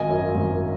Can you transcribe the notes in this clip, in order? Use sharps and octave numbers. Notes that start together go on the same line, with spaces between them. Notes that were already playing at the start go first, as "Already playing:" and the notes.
Already playing: G#1 D#5 G#5
F#2
G#1